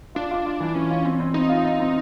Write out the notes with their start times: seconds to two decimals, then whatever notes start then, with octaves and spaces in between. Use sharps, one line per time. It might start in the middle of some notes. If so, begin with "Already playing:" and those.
0.15 D4 F4
0.31 F4
0.46 F4
0.60 E3
0.75 E3 C#4
0.90 F4
1.05 C4
1.20 C4
1.34 C4 D#4
1.49 F4
1.65 F4
1.80 C4